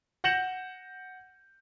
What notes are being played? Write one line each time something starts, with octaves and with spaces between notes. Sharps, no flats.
F#5 G6 A#6 C#7 E7 F#7